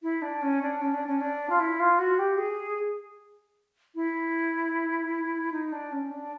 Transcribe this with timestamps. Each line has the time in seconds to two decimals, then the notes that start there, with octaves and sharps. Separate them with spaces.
0.02 E4
0.21 D4
0.42 C#4
0.61 D4
0.81 C#4
0.93 D4
1.06 C#4
1.20 D4
1.49 F4
1.59 E4
1.79 F4
1.98 F#4
2.18 G4
2.37 G#4
3.94 E4
5.52 D#4
5.72 D4
5.91 C#4
6.10 D4